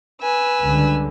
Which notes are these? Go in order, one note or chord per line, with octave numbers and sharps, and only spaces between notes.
B4 G#5 E6
C#2 D3 G3